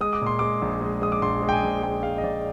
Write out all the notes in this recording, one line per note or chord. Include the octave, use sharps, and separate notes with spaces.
G#3 D#6
D6
A#2 C6
G#3 D6
A#1
G#3
G#3 D#6
D6
A#1 C6
G#3
G5
G#5
A#1
G#3 G5
G#3 F5
D#5
A#1 D5